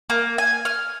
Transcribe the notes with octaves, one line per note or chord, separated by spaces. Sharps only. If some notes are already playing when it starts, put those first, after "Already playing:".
A#3
G#5
F6